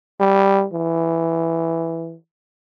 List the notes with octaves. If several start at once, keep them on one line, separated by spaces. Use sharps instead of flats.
G3
E3